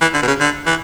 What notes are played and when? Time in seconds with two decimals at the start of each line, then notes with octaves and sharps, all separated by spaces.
0.01 E3
0.14 D3
0.22 B2
0.27 C#3
0.40 D3
0.66 E3